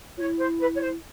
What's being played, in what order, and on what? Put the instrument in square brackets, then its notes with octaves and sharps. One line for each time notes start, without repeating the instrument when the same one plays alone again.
[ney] F4 [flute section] C#5
[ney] E4
[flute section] C5
B4
C#5
C5